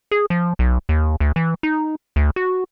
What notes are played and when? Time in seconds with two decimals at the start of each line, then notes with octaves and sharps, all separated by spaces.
0.11 G#4
0.30 F3
0.59 B1
0.89 D#2
1.20 D2
1.36 E3
1.63 D#4
2.16 D2
2.36 F#4